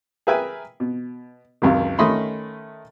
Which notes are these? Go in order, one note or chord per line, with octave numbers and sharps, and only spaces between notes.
G#4 A#4 B4 E5 G5 G#5
B2
C#2 F#2 C3 D#3
D#3 A3 C#4 D#5 B5 C6